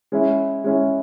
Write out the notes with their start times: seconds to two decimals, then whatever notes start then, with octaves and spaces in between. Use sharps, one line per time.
0.12 G#3 C#4 E4
0.64 G#3 C#4 E4